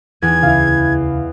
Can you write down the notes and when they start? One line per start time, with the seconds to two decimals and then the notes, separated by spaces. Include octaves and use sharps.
0.22 E2 G#6
0.43 D2 C#3 E4 F5